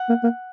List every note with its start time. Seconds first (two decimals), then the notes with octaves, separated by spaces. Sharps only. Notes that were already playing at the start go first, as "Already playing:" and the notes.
Already playing: F#5
0.09 A#3
0.24 A#3